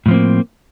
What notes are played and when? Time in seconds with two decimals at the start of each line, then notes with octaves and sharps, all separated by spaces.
0.06 A2
0.08 F3
0.11 C4
0.14 A#3